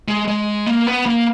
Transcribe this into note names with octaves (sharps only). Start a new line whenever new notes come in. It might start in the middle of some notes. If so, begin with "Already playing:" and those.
G#3
G#3
A#3
B3
A#3